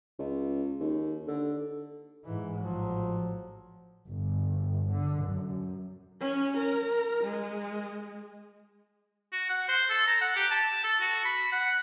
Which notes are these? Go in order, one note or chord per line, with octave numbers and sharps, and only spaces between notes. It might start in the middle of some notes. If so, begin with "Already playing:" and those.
C#2
D#2
D3
G#2 E3
A1 F3 F#3
G1
D3
F#2
C#4
A#4
G#3
F#4
F#5
C5
A4
A#5
F#5
G4
A5
A4
F#4
B5
F#5